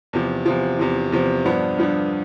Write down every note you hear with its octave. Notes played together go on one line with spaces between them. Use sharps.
E2 C3 F3
E2 C3 F3
E2 C3 F3
E2 C3 F3
G2 F3 B3 D4
G2 F3 B3 D4